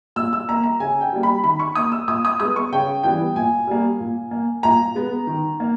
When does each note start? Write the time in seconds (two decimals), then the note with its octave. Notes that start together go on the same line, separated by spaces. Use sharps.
0.16 A#2 E6
0.33 E6
0.49 A#3 A#5
0.64 A#5
0.80 C#3 G#5
1.01 G5
1.13 G3 A#3
1.23 B5
1.44 D#3 B5
1.60 C#6
1.75 A#3 D#6
1.92 E6
2.08 A#2 D#6
2.25 D#6
2.40 G#3 B3 D#6
2.56 C#6
2.72 C#3 G5
3.03 E3 G3 B3 G5
3.35 A#2 G#5
3.67 G3 A#3
4.00 A#2
4.31 A#3
4.63 A#2 A#5
4.95 G#3 B3
5.27 D#3
5.60 A#3